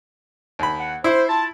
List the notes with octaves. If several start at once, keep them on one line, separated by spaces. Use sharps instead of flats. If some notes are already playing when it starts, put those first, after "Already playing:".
D#2 B5
F#5
E4 C5
F4 A5